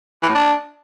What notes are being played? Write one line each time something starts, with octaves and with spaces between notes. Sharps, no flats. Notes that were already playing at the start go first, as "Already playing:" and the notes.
E3
A2
D4